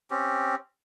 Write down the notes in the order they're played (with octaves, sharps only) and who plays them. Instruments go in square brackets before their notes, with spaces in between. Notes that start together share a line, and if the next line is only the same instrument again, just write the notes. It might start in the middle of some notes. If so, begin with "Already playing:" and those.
[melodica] C4 C#4 G4